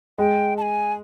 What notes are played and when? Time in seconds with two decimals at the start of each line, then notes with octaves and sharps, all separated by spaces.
0.18 G#3 G5
0.57 A5
0.62 G#5